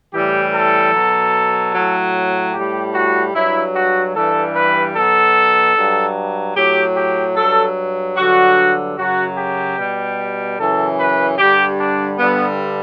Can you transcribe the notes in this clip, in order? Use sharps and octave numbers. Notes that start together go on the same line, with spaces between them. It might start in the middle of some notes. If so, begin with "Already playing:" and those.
A2 E3 G3 G4
A4
B2 F#3
A2 F#3
A2 G3 G4
F#4
G2 F#3 E4
F#4
G2 E3 G3 A4
B4
B2 F#3 A4
G2 F#3
A2 F#3 G4
G4
G2 F#3 A4
G2 D3 F#3 F#4
F#2 C#3 F#3 F#4
G4
B2 G3
F#2 C#3 E3 A4
B4
G2 D3 G3 G4
D4
G2 D3 G3 B3